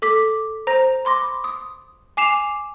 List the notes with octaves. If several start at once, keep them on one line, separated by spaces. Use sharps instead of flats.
A4 D6 B6
C5 A#5 A#6
B5 C6 D6 A#6
D#6
G#5 D6 C7 E7 F7